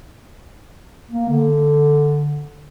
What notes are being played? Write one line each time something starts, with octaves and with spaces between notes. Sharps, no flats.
A#3
D3